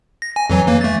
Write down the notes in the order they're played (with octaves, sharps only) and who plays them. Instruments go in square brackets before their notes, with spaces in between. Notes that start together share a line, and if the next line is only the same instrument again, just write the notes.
[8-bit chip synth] A#6
G#5
F2 E3 F#3
E3 A#3
A3 A6